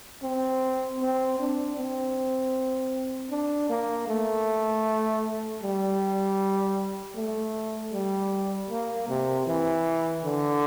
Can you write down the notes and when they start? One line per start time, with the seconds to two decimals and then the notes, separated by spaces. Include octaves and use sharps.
0.23 C4
1.00 C4
1.39 D4
1.77 C4
3.31 D4
3.70 A#3
4.08 A3
5.62 G3
7.16 A3
7.92 G3
8.70 A#3
9.08 C3
9.47 E3
10.24 D3